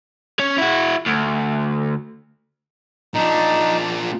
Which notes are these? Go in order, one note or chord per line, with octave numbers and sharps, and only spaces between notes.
C#4 C#5
E4 F#4
D2
A#2 D4 D#4